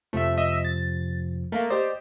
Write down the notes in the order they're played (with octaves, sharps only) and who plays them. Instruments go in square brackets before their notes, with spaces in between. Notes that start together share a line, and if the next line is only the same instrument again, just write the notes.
[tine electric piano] F2 C3 F3 [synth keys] A3 E5
[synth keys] D#5 E5 E6
A6
[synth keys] A3 A#3 [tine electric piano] A#4 F5
[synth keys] G4 C5 [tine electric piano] D5 D#5